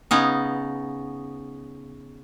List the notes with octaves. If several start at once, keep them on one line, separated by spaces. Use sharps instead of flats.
C#3 B3 C#4 D#4